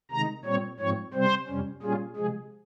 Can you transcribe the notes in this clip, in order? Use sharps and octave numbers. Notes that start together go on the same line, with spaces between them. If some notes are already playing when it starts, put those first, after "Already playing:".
C3 D#3 G#3 D#4 A#5
A#2 G3 C4 C#5
G#2 F3 C4 C#5
C3 G3 C4 C5
F2 C3 G3 C#4
A#2 G3 C#4 F4 G#4
C3 F3 G#3 G#4